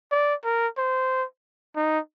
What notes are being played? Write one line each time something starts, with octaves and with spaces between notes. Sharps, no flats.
D5
A#4
C5
D#4